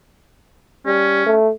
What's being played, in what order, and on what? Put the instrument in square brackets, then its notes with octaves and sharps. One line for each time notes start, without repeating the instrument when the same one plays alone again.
[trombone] G3 [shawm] C#4
[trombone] A3